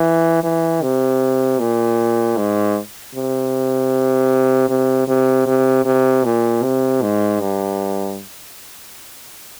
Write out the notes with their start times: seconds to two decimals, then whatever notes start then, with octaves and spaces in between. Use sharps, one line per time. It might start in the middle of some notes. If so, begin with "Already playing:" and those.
Already playing: E3
0.43 E3
0.82 C3
1.59 A#2
2.37 G#2
3.15 C3
4.69 C3
5.08 C3
5.46 C3
5.85 C3
6.24 A#2
6.63 C3
7.02 G#2
7.40 G2